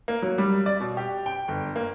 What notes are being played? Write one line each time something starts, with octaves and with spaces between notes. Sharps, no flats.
A#3
F#3
G3
D5
B2
G4
G5
G1
A#3